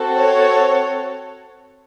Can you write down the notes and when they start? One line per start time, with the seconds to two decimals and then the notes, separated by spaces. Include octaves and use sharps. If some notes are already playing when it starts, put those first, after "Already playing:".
Already playing: C4 F#4 A4
0.16 C#5